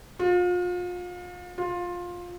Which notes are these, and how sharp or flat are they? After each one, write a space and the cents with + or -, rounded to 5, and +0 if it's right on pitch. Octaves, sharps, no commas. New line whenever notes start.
F4 +35
F4 +15